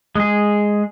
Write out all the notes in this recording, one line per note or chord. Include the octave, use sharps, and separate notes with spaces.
G#3 G#4